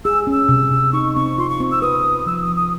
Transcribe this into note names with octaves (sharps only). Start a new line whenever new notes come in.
G#4 E6
C#4
E6
C3
C3
D#4 C#6
C4 C#6
F4 C6
C#6
C4
E6
B4 D#6
B4
F3 E6
D#6
F3
D#6